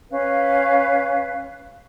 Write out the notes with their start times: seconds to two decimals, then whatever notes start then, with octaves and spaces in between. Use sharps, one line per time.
0.10 C#4 B4 F5